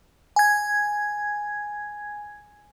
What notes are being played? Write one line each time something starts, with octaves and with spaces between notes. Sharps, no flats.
G#5 G#6